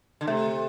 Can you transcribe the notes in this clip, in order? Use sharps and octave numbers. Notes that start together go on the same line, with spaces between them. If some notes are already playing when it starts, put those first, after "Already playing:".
D3
C3 A3